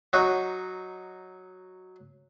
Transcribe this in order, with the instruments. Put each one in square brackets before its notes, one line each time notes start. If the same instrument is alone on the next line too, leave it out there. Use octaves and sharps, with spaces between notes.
[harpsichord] F#3 D#4 F#4